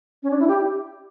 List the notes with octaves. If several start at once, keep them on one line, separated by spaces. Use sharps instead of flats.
C#4
D4
E4
G4